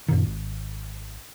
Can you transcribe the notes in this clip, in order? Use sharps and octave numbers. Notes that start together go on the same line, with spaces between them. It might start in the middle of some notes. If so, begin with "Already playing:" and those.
F#2 A#2 D#3
G#1